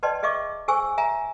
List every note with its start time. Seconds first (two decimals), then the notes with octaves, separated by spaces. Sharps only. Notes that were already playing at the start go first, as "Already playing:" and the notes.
0.03 B4 D5 D#5 G5 A5 C6
0.23 G#4 D#5 E5 C#6 D6
0.68 G#4 C5 G#5 C#6 E6
0.98 E5 G#5 A#5